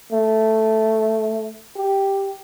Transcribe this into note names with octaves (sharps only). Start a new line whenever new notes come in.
A3
G4